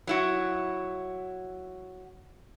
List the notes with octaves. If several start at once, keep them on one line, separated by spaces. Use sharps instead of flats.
F#3 E4 F#4